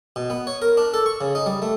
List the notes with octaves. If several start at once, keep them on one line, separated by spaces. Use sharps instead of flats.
B2
B3
C#5
A#4
D4
A4
C#6
C#3
D#4
G3
A3